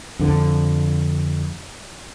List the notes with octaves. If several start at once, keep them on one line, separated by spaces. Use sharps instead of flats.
F2 D3